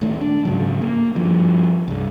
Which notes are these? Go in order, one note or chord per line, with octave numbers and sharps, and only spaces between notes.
D#1 D#2 A2 A3
D4
G#2 C#3 F#3
A#3
G2 F3
C2 G2